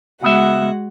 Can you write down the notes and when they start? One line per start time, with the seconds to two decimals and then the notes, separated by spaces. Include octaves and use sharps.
0.22 C#2 G#3 B3 F#4 E5 F#5